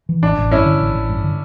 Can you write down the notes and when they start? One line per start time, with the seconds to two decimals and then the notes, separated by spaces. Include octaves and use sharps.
0.09 E3
0.22 A1 D4
0.37 A1
0.51 G2 C#4 E4
0.66 D3
0.80 A1
0.95 A1
1.09 G2
1.24 D3